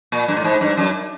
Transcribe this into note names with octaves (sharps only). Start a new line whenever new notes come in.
A#2
G2
A2
G#2
G2
F#2